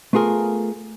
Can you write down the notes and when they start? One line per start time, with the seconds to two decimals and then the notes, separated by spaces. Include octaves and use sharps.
0.13 A3 B3 F4 G#4 A#4